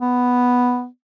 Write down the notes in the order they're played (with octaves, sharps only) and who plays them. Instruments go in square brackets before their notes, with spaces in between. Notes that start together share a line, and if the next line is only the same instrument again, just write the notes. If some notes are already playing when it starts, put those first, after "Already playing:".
[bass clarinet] B3